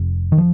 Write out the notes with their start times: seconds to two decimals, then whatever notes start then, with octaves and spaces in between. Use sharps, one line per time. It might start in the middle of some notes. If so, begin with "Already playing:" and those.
Already playing: F1
0.32 D#3
0.38 F3